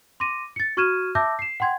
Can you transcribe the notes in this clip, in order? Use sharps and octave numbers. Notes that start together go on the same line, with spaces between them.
C6 D6 A#6 D#7
A6 C#7
F#4 C#6 F6 G#6 D#7 E7
E5 A5 D6 E6 G6 A#6
C7 E7
F#5 G5 C6 G#6